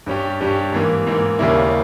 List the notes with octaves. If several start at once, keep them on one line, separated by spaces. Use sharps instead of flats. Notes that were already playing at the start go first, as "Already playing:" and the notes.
G2 G3 C#4 G4
G2 G3 C#4 G4
G#2 E3 A#3
G#2 E3 A#3
D#2 C#3 G3 A#3 E4